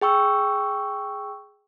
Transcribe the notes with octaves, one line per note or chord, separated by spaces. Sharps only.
G#4 G5 C#6 E6